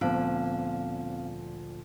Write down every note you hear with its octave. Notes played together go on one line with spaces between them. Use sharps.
D2 A#2 F3 B3 C4 F5